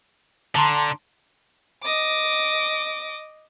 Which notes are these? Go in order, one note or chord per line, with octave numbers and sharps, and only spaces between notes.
D3 A5 A#5 C6
D#5 D6